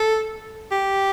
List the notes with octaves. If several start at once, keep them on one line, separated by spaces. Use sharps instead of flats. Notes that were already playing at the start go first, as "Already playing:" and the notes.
Already playing: A4
G4